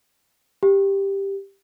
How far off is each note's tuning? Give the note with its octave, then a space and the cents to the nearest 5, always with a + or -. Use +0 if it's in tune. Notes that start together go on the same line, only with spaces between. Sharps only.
G4 +5